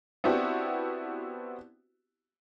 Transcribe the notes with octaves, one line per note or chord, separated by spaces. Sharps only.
B3 C4 D4 E4 F#4 G4